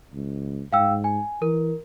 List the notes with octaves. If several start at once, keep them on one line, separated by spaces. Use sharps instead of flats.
C#2
G#2 F5 G5 E6
G#5
E3 A#4